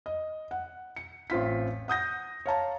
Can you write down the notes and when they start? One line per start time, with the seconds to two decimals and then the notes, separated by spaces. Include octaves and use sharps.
0.06 D#5
0.51 F#5
0.96 C#7
1.30 A1 C4 F4 B6
1.88 F#5 D#6 G6 A#6
2.46 C#5 F5 A5 A#5